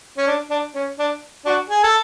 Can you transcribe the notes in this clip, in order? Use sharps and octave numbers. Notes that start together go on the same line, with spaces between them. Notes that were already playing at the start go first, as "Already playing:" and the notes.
C#4
D4
D4
C#4
D4
D4 F#4
G#4
A4